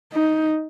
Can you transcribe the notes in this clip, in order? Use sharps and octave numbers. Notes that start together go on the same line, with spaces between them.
D#4